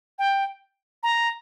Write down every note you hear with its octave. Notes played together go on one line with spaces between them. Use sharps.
G5
A#5